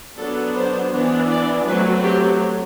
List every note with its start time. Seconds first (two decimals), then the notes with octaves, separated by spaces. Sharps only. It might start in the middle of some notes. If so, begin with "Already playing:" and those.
0.17 F#3 B3 D4 A4
0.55 C5
0.92 E3 B3 D4
1.30 D5
1.66 F#3 A3 C4 B4
2.03 G4